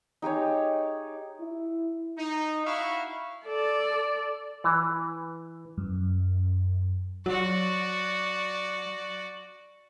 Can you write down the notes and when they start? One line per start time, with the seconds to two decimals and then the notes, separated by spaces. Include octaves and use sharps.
0.22 D#4 G4 G#4 C#5
1.40 E4
2.18 D#4
2.67 E4 F#4 E5 F5 C#6
3.44 A4 D5
4.64 E3
5.78 F#2
7.26 F#3 F#4 D5